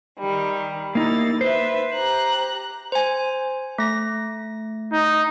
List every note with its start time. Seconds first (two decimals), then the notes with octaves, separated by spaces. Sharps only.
0.19 D#3 G3
0.95 A#3 D#4 E4 A6
1.41 B4 C5 E5
1.95 G4 A#5 F#6
2.92 C5 G#5
3.78 A3 A#6
4.92 D#4